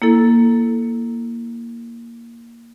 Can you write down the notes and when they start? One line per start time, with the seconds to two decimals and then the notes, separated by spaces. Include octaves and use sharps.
0.02 A#3 E4 A4